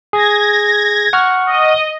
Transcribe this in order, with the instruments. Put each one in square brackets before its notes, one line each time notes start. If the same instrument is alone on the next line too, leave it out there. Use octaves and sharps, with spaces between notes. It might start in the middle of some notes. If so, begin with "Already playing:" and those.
[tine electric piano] G#4 [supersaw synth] G#6 A#6
[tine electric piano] F#5 C#6 F6
[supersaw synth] D#5